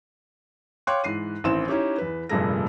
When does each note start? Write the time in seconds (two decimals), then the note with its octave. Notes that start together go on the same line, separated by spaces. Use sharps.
0.87 C#5 F5 G5 C6 D6 F#6
1.04 G#2 E3 C7 D#7
1.44 A1 D#3 E3 C4 C6 E7
1.68 C#4 D#4 E4 G4 C#5
1.98 E2 B4
2.29 F1 G2 A#2 A3 G#4 A#6